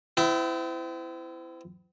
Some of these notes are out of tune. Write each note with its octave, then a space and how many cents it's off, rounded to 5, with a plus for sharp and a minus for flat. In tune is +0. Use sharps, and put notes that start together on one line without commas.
C4 -40 E4 +15